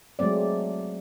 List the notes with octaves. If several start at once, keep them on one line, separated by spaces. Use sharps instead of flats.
F#3 G#3 A3 C4 D5